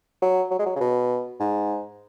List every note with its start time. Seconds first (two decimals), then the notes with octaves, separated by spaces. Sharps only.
0.22 F#3
0.51 F#3
0.59 G#3
0.66 F#3
0.75 C#3
0.81 B2
1.40 G#2